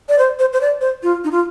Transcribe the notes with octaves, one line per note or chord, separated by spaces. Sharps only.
D5
C5
C5
C5
D5
C5
F4
D#4
F4